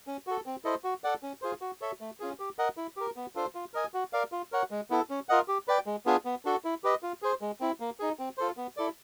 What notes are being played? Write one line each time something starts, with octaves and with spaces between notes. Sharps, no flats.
C#4
F#4 A4
C4
E4 A4 C5 D#5
F#4
A4 D5 F#5
C#4
F4 G#4 C5
F#4
A4 C#5 E5
A3
C#4 F4 G#4
G4
A#4 D#5 F#5
E4
G4 A#4
B3
D4 F4 A4 C5
F4
A#4 D#5 G#5
F#4
A#4 D5 F5
F4
A#4 C#5 F#5
G#3
B3 E4 A4
C#4
F4 A#4 D#5 F#5
G4
B4 D5 G5
G#3
B3 D4 F4 G#4
B3
D4 F#4 A4
E4
G4 B4 D#5
F4
G#4 C5
G#3
C4 E4
A#3
D#4 G#4
C4
F4 A4 C5
B3
E4 A4 D5